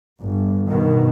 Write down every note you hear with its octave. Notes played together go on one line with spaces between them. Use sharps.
G1
G2 B2 D#3